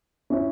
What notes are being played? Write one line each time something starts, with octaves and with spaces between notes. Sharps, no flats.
C#4 E4